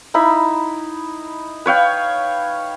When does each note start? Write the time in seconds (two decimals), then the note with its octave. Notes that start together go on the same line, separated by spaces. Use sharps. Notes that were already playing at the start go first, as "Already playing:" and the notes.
0.14 D#4 E4 B5
1.66 B4 C#5 F5 G5